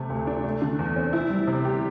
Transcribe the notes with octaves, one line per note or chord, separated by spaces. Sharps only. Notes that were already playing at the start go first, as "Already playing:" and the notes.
Already playing: C3 A3
D2
D4
A3
D3
E2
C4
E4
G3
C3
G4